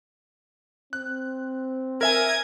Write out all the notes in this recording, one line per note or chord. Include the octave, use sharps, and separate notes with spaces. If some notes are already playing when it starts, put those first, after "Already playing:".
C4 F#6
A#4 E5 G#5 D#6 G#6